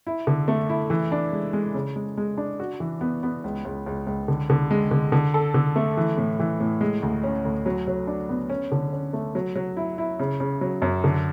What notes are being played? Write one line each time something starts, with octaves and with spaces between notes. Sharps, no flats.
E4
D3
A3
E4
E3
D4
G#3
G#3
C#3
G#3
G#3
D4
F#4
E3
B3
B3
C#2
C#2
C#2
C#2
D3
D3
G#3
D3
D3
A4
D3
A3
E3
A2
E3
A2
G#3
D2
C#4
D2
F#3
F#3
D4
B3
C#4
D3
C#4
A3
F#3
F#3
E4
E4
C#3
C#3
F#3
F#2
D3